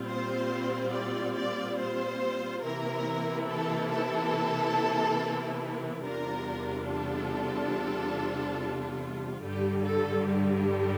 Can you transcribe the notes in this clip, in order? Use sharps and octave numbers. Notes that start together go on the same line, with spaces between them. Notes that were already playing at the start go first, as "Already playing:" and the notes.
Already playing: A#2 G3 C4 F4
C5
D5
D5
C5
C3 E3 A#3 E4 A#4
A4
A4
E2 C3 G3 D4 F4 A#4
A4
G2 D3 G3 G4
A4
G4